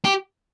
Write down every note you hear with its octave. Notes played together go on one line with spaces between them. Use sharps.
G4